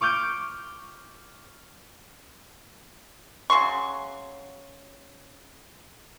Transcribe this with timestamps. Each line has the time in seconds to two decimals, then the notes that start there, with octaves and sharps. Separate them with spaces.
0.01 C#6 D6 F6 G6 D7 D#7
3.50 C#3 F#3 C6 C#6